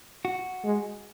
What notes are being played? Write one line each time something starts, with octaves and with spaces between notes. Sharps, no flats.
F#4
G#3